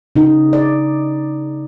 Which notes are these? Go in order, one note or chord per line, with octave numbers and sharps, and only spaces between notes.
C#3 D#4
D5